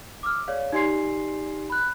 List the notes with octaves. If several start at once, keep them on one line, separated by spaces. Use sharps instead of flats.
D6 E6 F6
G#4 C#5 D5 F5
D#4 G4 D5 G#5 C6 C7
B5 F#6